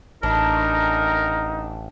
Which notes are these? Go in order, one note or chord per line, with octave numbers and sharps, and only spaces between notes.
A1 D4 D#4 A#4